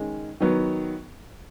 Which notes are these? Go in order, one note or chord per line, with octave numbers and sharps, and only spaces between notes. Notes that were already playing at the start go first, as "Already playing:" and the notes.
Already playing: D#3 G#3 C#4
D#3 F#3 B3